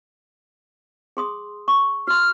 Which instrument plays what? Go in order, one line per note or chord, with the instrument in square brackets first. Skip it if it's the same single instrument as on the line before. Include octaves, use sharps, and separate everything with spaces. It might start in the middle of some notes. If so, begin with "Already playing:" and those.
[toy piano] G#4 C6 D#6
C#6
[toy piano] F#4 C6 [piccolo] F6